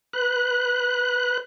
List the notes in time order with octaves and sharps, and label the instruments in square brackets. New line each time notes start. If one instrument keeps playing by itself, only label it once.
[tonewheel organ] B4 F#6